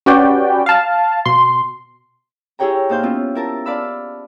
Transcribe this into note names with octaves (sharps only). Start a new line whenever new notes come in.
C#4 F#4 G4 B4 D5 G5
F5 A5
B2 C6
E4 G4 G#4 C#5 G5 A#5
A#2 D#4 C5 F5 G6
B3 C#4 E4 F4
E4 A#4 A5
D5 F5 A5 B5 E6